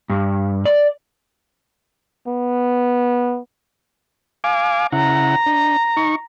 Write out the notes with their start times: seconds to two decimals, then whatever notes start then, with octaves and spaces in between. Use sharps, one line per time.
0.10 G2
0.65 D5
2.27 B3
4.44 F5 G#5 D6
4.92 C#3 E4 F#5 A#5
5.46 D4
5.97 D#4 C#6